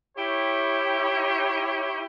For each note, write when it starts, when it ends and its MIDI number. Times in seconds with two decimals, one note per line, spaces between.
0.17 2.03 64
0.17 2.03 67
0.17 2.03 73